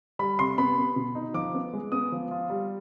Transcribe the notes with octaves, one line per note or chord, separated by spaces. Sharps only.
G3 B5
C3 C6
B3 B5
B3
B2
D#4
F3 D6
B3
G#3
B3 D#6
F3
F4
G3